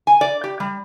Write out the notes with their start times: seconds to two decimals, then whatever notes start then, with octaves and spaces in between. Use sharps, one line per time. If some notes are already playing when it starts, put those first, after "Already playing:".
0.07 G#5
0.21 D5
0.44 G4
0.60 G3